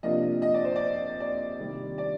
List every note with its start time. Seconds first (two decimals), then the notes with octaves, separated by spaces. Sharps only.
0.03 C3 F3 A#3 D4 F4 D#5
0.42 D#5
0.54 D5
0.64 C5
0.76 D5
1.20 D5
1.59 C3 D#3 G3
1.98 D5